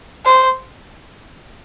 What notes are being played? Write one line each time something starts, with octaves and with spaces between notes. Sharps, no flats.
C5